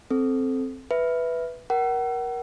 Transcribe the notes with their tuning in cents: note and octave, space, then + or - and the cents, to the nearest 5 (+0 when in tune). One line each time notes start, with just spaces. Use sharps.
C4 +0 A4 -10
B4 +0 E5 +0
A#4 +25 F#5 +35